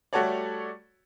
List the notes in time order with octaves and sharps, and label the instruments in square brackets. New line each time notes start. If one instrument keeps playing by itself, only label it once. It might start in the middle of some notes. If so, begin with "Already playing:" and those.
[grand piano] G3 A3 F#4 A4 C#5 D5